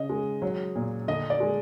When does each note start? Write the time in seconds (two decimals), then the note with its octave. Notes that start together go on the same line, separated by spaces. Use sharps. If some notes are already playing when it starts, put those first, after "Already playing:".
Already playing: C#3 D#5
0.10 G#3
0.42 F#3
0.75 A#2
1.08 D3 D#5
1.30 D5
1.40 G#3